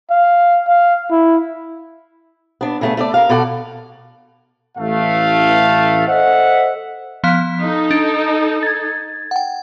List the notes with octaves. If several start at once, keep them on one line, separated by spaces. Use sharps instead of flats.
F5
F5
E4
B3 D4
C#3 A3 B3
A3 A4 D5
A#4 F5
B2 A4 D5 F#5
A1 A3 F5
A4 C5 D#5 E5 F#5
F3 B3 F5
D#4 A4
D4
G#6 A6
F#5 G5